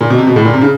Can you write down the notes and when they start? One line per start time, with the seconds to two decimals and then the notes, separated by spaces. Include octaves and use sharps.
0.01 A#2
0.10 B2
0.18 C3
0.27 B2
0.36 A2
0.45 A#2
0.54 C3
0.61 C#3